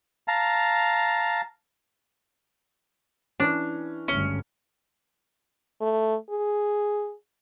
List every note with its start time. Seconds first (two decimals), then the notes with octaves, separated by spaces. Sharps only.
0.28 F5 A5 A#5
3.40 E3 C#4 D4
4.08 G#1 D2 G2 C#4
5.81 A3
6.30 G#4